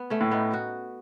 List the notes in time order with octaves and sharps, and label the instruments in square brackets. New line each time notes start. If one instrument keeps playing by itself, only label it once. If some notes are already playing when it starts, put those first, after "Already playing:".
Already playing: [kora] B3
A3 C#4
[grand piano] A2
[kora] B3 D#4
F#4